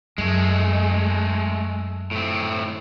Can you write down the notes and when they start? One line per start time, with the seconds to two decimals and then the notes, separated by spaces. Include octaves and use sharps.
0.18 F#2 G#3 A3
2.11 A2 C4